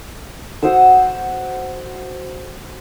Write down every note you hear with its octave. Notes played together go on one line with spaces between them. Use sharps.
F#4 C5 D#6 E6